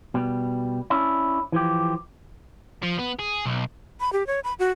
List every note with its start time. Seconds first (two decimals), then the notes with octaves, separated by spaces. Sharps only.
0.14 B2 G3
0.90 C#4 D4 E4
1.52 E3 F3 G4
2.83 F3
2.99 B3
3.19 G#4
3.45 B1
4.00 B5
4.13 G4
4.27 C#5
4.44 B5
4.59 F#4